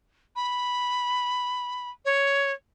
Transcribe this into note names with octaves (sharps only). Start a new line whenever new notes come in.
B5
C#5